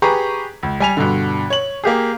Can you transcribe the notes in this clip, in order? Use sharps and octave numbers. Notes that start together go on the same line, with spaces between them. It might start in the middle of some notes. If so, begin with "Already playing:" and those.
G4 G#4 B4 A#5 C#6
C#2
G3 G#5 F7
G2 B2 D3
C#5 F#7
A#3 G4 G#4